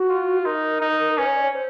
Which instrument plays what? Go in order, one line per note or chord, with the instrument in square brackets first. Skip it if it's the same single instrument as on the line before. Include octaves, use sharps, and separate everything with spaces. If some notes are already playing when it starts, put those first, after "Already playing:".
Already playing: [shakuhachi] F#4
[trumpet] F4
[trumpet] D#4 [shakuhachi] A#4
[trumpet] D#4
[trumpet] C#4 [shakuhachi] B4
[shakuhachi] C#5
D5
C#5
C5